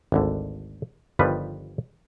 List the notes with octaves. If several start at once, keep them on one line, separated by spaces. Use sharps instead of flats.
G#1 D2 D3
G1 D#3 F3 G3 B4